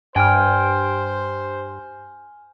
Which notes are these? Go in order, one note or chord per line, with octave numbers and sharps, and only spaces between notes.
G2 C5 G5 G#5 F6